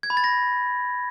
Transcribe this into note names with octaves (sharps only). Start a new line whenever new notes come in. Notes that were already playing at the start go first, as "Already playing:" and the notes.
G#6
B5
A6
A#6